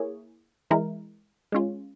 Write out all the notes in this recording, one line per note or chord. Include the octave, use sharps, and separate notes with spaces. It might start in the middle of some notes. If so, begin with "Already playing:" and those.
Already playing: A#3 E4 G#4 C#5
E3 G#3 E4 A#4
G#3 C#4 F4